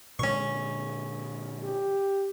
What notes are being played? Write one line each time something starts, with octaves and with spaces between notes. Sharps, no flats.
A#2 D3 G#3 C#4 C#6
G4